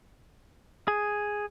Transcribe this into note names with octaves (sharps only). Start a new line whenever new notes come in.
G#4